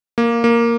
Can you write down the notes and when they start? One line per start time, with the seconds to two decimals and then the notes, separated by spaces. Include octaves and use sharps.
0.18 A#3
0.44 A#3